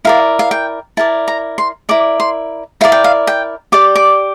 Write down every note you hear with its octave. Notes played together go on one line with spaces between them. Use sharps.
E4 A#4 D5 F5
F5
G5
E4 A#4 D5 A5
A#5
C6
E4 A#4 D5 D6
C6
E4 A#4 D5 F5
G5
F5
G5
G4 D5 D6
D6